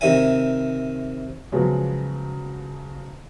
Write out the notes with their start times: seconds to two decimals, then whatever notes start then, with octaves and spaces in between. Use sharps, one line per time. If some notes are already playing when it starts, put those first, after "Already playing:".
0.01 C3 D#3 E5 G#5
1.52 C#3 F3 F#3 G#3 B3